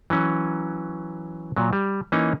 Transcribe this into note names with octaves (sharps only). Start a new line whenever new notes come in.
E3 F#3 C#4
A#2 F#3
G3
E3 A#3 C#4 D#4